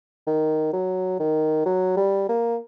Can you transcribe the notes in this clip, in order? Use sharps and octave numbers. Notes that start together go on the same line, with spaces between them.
D#3
F#3
D#3
F#3
G3
A#3